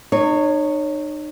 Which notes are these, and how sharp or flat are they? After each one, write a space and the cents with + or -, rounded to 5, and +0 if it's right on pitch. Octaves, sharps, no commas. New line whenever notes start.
D#4 -40 C#5 -5